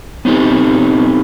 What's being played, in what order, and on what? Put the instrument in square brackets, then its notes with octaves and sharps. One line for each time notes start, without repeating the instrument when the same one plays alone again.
[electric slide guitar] B3 C4 D#4 G4 A4